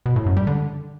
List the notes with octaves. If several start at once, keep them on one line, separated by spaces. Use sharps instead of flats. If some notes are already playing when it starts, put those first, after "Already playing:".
B2
A2
F#2
G3
D3